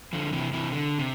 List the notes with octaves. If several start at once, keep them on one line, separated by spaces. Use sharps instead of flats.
D3 F3
C3 E3
C3 E3
D3
C3